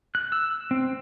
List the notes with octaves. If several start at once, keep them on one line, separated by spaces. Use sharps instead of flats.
F#6
E6
C4